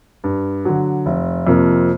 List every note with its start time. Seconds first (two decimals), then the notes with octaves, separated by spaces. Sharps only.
0.24 G2
0.65 D3 F#3
1.06 F1
1.47 F2 C3 F3 A#3